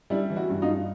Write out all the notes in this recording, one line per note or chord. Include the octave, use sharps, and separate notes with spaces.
G3 D4 E4
E3
E4 F#4
G2 F#4
D#4 F4
G2